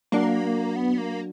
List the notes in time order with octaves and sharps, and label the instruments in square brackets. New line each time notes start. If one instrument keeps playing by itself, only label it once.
[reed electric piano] F#3 D4 F#4 [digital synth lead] A#3
[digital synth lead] B3
A#3